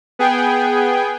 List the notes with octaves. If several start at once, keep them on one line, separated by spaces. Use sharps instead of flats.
B3 G#4 G5